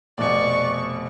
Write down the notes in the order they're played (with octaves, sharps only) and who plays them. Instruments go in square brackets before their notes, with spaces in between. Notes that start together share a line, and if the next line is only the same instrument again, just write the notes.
[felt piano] F1 B2 [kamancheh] D5 C#6